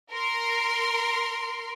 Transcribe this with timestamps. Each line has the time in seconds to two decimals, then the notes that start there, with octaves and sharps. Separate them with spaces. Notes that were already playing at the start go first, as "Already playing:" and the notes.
0.11 A#4 C6